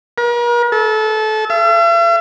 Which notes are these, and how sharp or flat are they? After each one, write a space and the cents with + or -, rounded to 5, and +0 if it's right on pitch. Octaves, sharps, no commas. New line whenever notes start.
A#4 +45
A4 -25
E5 +45